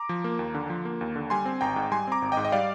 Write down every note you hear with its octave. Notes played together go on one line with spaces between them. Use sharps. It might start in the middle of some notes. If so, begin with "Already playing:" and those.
Already playing: A#5 D6
F3
A#3
D#2
D3
F3
A#3
D#2
D3
G3 G#5 C6
C4
G#1 G5 A#5
G#2
G3 G#5 C6
C4 A#5 D6
G#1
D#5 G5
G#2
D#5
G3 D5 F5